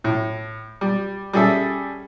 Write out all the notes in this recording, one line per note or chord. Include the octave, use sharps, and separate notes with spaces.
A2
G3
G3 C#4 G#4 A4 E5